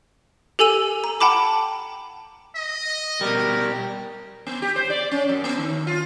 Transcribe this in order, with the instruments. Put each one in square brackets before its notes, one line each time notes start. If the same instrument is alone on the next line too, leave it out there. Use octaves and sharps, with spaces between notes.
[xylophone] G4 A4 G#5 E6 D#7
A#5
F#5 G5 A5 B5 D6
[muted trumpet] D#5
[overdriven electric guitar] B2 G3 [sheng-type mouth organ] G4 A#4
[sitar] B3
G4
C5
D5
C#4
F#2
B3
D#3
F4